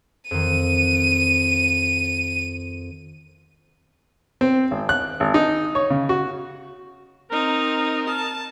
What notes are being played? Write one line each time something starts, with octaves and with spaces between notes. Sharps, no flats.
F2 D#3 D#7
C4
G#1
F#6
G#1
D#4
C#5
C#3
F#4
C4 D#4 A#4
A5